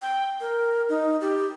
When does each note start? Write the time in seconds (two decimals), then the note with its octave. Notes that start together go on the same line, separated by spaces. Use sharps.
0.02 G5
0.40 A#4
0.89 D#4
1.21 G4